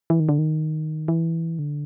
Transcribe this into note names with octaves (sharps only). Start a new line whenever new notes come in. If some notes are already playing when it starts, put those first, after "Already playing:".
E3
D#3
D3
D#3
E3
D3